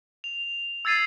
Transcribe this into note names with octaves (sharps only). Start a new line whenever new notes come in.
F7
E6 G#6 A6 C7 D#7